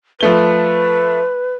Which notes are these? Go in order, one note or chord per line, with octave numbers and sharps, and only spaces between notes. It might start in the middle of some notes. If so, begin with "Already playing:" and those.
F3 A3 B4 G7